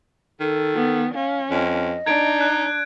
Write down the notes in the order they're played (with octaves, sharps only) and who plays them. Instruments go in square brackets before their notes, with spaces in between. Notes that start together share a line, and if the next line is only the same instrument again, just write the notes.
[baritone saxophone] D#3 [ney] A4
[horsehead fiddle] B3
[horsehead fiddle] C#4 [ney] F5
[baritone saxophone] F2 [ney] D#5
[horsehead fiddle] D4 [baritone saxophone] D#4 [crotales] G#6 D7
[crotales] F#6